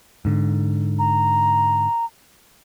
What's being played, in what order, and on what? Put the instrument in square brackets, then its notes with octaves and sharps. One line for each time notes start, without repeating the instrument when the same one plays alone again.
[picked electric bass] G#2 D3
[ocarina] A#5